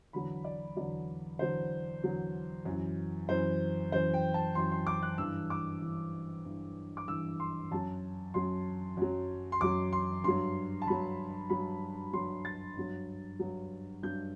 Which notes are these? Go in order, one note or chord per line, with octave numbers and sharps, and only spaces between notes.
E2 D3 F#3 B5
D5
E2 D3 F#3 D5
E2 D3 F#3 C5
E2 D3 F#3
F#2 E3
F#2 E3 C5
F#2 E3 C5
G5
A5
F#2 E3 C6
C6
D6
F#6
G2 E3 E6
D6
G2 E3
G2 E3
D6
G2 E3 E6
C6
F#2 F#3 A5
F#2 F#3 C6
F#2 F#3
C6
F#2 F#3 D6
C6
G2 F#3 C6
A5
G2 F#3 B5
G2 F#3 B5
G2 F#3 C6
A6
G2 F#3
G2 F#3
G2 F#3 G6